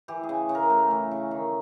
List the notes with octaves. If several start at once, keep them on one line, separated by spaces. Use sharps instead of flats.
E3 G4
G#4
C#3
C#3
A#4
A3
E3
C#3
D#3